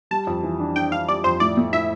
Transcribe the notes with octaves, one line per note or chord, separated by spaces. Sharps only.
G3 A5
F2
E3
D4
D4 G5
D4 F5
G3 D5
F2 C5
A2 D5
A3
E4 E5